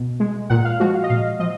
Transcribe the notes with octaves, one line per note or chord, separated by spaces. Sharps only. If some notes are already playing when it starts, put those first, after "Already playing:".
Already playing: B2
G#3
A#2 F#5
F5
F3 G#3 F#4
F5
D#5
A#2 F5
F3 D#5